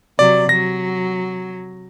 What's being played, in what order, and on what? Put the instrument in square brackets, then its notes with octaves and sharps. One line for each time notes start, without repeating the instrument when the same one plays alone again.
[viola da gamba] C3 F#3 [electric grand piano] D5
[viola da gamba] F#3 [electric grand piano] A#6